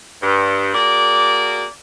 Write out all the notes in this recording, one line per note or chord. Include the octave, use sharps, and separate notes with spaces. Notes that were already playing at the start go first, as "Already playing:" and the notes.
G2
A#3 F#4 G#4 D5